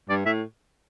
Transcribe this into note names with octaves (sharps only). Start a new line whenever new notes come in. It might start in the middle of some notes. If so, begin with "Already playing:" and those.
G2 D5
A2 E5